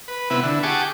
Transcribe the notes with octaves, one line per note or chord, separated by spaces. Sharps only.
B4
C3 B3 E4 B4
D3 E4
G4 G#4 F#5 A5 C#6 D6